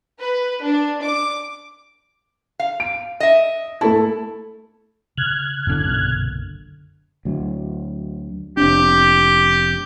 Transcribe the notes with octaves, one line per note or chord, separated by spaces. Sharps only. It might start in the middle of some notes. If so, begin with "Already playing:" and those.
B4
D4
D6
F5
D7
D#5 E5
A3 E4 A4 A5
C#3 F6 F#6 G#6
F#1 A2 D3 B3 C#4
B1 G2 A#2
D2 F#3
F1 C4 D4 G4